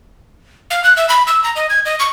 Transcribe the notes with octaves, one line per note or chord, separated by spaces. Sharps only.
F5
F#6
E5
B5
E6
A#5
D#5
G#6
D#5
C#6